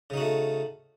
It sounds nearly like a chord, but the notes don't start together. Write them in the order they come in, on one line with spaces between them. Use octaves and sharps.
C#3 D#4 F#4 A3